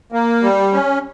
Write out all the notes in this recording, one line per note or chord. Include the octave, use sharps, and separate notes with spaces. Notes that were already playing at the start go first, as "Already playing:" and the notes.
A#3
G3
C#4